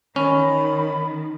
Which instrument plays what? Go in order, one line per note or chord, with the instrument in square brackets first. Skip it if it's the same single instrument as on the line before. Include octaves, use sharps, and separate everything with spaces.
[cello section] D#3 [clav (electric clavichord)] C#4 [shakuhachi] B5